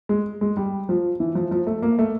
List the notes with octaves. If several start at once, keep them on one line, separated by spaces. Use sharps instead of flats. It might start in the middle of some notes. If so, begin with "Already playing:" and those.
G#3
G#3
G3
F3
E3
F3
F3
A3
A#3
A3